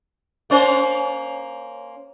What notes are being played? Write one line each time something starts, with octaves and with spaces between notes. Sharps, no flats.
A#3 C#4 C5